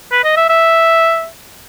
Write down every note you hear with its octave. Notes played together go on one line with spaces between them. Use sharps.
B4
D#5
E5
E5